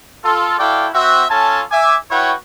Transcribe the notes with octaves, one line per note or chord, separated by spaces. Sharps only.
F4 A4
E4 F#4 A4 D5 F5 G5
C4 F#4 E5
C#4 F4 A4 G#5 A5
E5 G#5 D6
E4 F#4 B4 C#5 F#5 G5